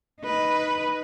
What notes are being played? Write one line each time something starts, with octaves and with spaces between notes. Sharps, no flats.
D#4 B4